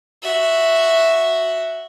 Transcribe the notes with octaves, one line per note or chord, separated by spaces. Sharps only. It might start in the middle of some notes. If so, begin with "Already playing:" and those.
F#4 E5